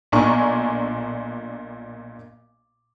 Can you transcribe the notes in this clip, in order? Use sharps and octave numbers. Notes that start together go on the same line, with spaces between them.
B1 A#2 D4 G#5 A#5 C#6